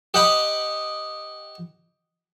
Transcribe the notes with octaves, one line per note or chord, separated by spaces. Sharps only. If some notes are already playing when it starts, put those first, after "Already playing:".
G4 D#5 F#5 G5 B5 D#6